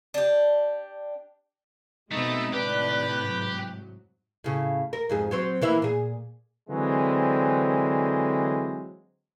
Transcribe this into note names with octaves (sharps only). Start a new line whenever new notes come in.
D4 G4
B2 G#3 A3 C4 D#4 E5 B5
A2 C3 D#3 D4 G4 B4 F#6
G#2 F#3
A2 C#3
A#4
F2 G#2 G#4
F#3 C4 C5
E3 A#3 E4
A#2 G#4
D3 E3 F#3 G#3 C4